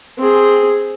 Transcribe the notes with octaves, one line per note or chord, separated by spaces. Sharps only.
C4 G#4